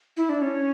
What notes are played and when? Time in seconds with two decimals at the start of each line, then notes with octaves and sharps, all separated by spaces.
0.17 E4
0.29 D4
0.42 C#4